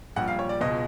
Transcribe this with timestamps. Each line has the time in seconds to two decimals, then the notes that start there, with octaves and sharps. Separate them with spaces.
0.16 A#1 A#2 G3 F#5
0.28 F5
0.39 C#5
0.49 D5
0.61 C#2 B2 G#3 D#5